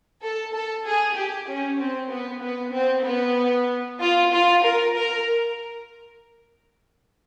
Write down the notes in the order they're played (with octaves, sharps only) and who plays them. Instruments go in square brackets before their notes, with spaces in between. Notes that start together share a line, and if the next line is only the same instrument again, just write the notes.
[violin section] A4
A4
G#4
G4
C#4
C4
B3
B3
C4
B3
F4
F4
A#4
A#4